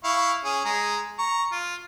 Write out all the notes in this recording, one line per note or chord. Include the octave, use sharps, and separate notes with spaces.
E4 F5 C#6
C#4 G#4
G#3 A#5
A#5 C#6
F4